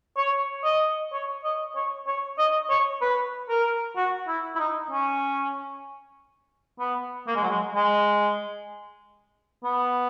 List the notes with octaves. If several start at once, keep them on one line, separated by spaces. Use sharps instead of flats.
C#5
D#5
C#5
D#5
C#5
C#5
D#5
C#5
B4
A#4
F#4
E4
E4
D#4
C#4
B3
A#3
G#3
F#3
G#3
G#3
B3